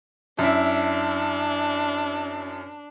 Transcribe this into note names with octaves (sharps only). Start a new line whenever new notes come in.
F#2 D4 E4